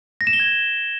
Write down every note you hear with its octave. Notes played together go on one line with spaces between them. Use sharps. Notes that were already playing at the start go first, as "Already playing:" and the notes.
A#6
E7
G7
G#6